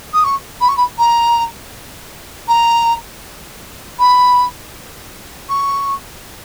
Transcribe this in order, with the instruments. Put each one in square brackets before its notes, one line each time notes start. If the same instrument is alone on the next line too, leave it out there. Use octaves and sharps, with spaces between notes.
[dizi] D#6
C#6
B5
C#6
B5
A#5
A#5
B5
C#6